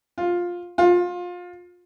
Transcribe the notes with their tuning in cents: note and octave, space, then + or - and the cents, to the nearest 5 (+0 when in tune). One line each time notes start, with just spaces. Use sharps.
F4 +10
F4 +25